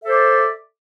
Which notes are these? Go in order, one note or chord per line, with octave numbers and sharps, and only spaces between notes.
A4 C5 D5 E5